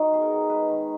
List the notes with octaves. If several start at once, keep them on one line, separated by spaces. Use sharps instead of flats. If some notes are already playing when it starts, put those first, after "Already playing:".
Already playing: D#3 D#4 F#4
B3 G#4
A#4
D#3
G#3 B4
D#3